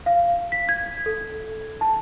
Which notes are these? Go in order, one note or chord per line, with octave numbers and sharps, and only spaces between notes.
F5
B6
G#6
A4
A5